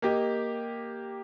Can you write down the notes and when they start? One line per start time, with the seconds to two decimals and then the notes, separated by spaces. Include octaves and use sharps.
0.02 A#3 G4 D#5